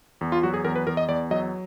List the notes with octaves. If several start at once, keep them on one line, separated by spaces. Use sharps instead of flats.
E2
F4
F#3 F#4
G#4
E2 A#4
B4
E2 A#4
D#5
E2 D5
F#3 D#5